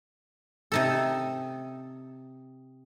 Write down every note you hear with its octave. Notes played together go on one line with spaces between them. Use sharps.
C3 D#4 A4